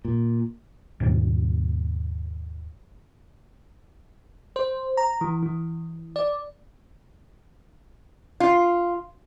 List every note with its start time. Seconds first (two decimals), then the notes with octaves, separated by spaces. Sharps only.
0.05 A#2
1.00 D#2 G#2 B2 G3
4.56 C5
4.97 A#5
5.21 E3
5.43 E3
6.16 D5
8.40 F4